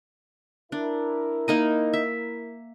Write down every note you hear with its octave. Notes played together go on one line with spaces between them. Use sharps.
D4 E4 A#4
A#3 D#4 D#5
E5